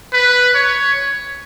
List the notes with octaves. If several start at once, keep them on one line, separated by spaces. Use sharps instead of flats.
B4
C#5